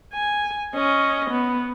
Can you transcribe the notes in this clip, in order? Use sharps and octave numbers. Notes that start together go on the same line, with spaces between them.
G#5
C#4 D#5
B3